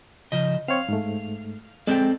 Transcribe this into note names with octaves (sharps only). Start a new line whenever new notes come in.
C#3 F3 D#5
C4 C#5 F5
G#2 A3
G#3 C4 A4 D5 G5